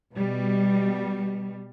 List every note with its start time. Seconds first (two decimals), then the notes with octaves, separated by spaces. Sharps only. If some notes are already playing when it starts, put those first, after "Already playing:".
0.14 B2 G3